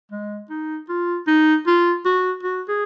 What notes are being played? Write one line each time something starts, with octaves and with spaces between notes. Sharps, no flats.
G#3
D#4
F4
D#4
F4
F#4
F#4
G#4